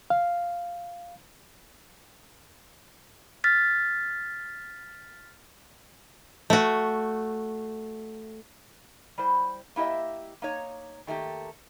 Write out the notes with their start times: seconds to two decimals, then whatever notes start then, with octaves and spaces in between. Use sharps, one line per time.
0.10 F5
3.44 F6 A6 B6
6.50 A3 F#4
9.18 G3 E4 C5
9.76 A#3 E4 G4 D#5 E5
10.42 A#3 D#4 C#5
11.07 D#3 A3 A#3 G4